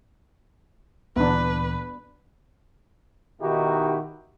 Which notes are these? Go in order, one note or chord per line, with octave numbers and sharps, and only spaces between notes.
D2 A#2 E3 B3 D4 B4
B2 D#3 D#4 E4 F#4 G4